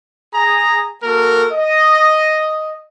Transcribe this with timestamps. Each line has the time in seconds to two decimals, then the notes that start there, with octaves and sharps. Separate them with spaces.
0.34 G#4 A#5
1.03 A#3 F#4 A4 A#4
1.51 D#5